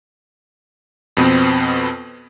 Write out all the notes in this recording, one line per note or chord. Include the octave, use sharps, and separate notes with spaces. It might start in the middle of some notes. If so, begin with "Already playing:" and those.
F2 B2 B3 C4